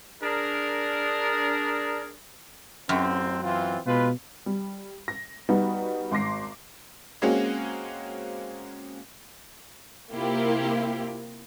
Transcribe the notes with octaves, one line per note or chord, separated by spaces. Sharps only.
D4 G#4 A#4
A1 F#2 C4
E3 C4 F4
B2 G#3 F4 B4
G3
A#6
G3 B3 D#4 F#4
G#1 C6 D6 A#6 C7
G#3 A#3 C4 C#4 F#4 G#4
C3 A#3 E4 F4 G4